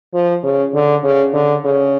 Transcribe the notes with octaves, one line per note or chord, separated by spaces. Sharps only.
F3
C#3
D3
C#3
D3
C#3